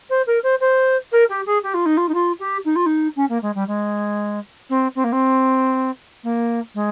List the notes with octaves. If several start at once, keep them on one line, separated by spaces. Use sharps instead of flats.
C5
A#4
C5
C5
A#4
G4
G#4
G4
F4
D#4
F4
D#4
F4
G4
D#4
F4
D#4
C#4
A#3
G#3
G3
G#3
C4
C4
A#3
C4
A#3
G#3